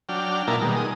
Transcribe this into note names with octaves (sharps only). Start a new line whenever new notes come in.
F#3 D4 G5 F6
A#2 A#3 D#4 E4 A#4 A5
B2 D#3 G3 G#3
G#3 D#6